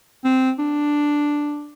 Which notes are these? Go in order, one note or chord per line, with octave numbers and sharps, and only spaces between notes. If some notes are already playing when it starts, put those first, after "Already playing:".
C4
D4